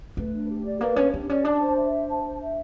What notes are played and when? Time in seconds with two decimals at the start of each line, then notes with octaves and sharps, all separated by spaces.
0.17 A3 B4
0.33 D4
0.49 G4
0.65 D5
0.81 A#3 B4
0.96 C#4 D4
1.13 C4 G4
1.29 C#4 D5
1.45 D4 A5
1.61 C5
1.77 E5
1.93 C5
2.09 A5
2.25 C5
2.41 E5